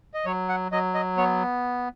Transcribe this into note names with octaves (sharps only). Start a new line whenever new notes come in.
D#5
F#3 C#5
F#5
F#3 D#5
D#5
B3 C#5